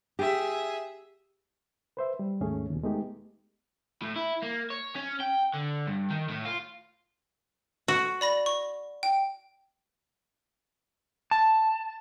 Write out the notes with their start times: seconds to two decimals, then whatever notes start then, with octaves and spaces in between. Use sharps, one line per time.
0.19 G4 G#4 E5
1.97 B4 C5 E5
2.19 G3
2.41 D#2 G#2 A3 C#4 G#4
2.71 D#2 B2
2.83 G#3 A3 B3 D#4 G4
4.02 A2
4.16 E4
4.42 A#3
4.70 C#5
4.95 C#4
5.20 G5
5.54 D3
5.87 G2
6.10 D#3
6.29 A2
6.45 F4
7.88 F#4
8.21 D5 B5 A#6
8.46 C#6
9.03 G5
11.31 A5